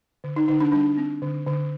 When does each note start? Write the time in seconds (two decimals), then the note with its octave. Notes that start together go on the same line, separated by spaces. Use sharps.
0.24 D3
0.36 D#4
0.48 D3 D#4
0.60 D4
0.72 G3 D4
0.98 C4
1.22 D3
1.46 D3